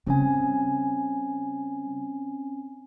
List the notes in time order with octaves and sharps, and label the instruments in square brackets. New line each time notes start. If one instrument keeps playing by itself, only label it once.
[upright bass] C#3 G3 [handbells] C4 C#4 G#5